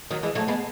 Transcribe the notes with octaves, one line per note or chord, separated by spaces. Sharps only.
D#3 F#3
E3 G#3
F#3 A3
G#3 B3